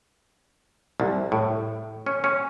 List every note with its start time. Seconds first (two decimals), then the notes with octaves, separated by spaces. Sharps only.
1.00 C2
1.32 A2
2.06 C#4
2.24 C#4